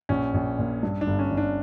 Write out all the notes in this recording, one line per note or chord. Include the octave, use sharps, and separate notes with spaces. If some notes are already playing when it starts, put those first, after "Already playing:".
A#1 C#4
A#1
A#2
G2
D4
G1
C#4
G1
D4